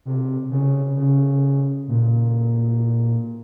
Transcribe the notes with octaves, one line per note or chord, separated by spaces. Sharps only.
C3
C#3
C#3
A#2